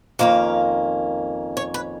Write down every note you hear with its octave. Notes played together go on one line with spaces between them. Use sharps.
F2 D#3 A#3 C#4 F5
C#5
B4